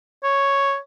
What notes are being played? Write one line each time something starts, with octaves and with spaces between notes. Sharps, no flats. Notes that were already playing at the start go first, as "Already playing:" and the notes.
C#5